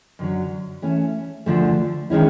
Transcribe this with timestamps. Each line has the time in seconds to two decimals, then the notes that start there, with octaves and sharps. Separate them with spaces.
0.19 F#2 D3 F#3
0.82 E3 A3 C#4
1.46 D2 D3 F3 A3
2.10 D#3 G#3 C#4 E4